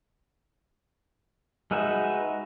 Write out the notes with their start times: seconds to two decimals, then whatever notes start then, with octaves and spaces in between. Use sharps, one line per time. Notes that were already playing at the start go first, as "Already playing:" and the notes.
1.71 G#3 D#4 F#4 B4 E5